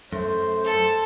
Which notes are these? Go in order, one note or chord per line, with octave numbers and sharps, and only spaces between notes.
F#2 A3 C5
A4